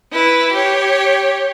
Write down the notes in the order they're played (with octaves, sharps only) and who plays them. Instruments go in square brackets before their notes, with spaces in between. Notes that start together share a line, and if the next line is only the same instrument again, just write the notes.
[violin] E4 B4
G4 C#5